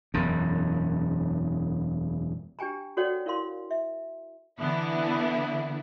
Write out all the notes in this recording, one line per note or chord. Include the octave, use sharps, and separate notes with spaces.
E1 F#2
D4 G4 G5 G#5 A#5
F#4 A4 C#5 D5 F#5 G5
E4 A#4 F5 C6
E5
D3 E3 B3 E4